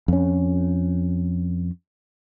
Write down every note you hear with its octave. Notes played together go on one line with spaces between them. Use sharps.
F2 C#4